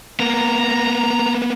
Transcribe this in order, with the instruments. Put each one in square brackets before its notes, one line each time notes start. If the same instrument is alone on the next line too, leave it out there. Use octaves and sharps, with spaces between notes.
[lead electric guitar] A#3 B3 [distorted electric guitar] A#5